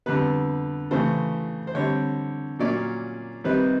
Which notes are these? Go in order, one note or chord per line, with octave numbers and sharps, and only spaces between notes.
F2 D3 G3 B3 B4
C#3 E3 A3 C5
C5
D3 G3 C4 C#5
A#2 F#3 A#3 C#4 D5
C3 D#3 G3 C4 B4